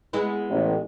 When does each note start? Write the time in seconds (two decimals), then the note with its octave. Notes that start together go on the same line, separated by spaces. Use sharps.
0.13 G#3 B3 E4
0.50 A1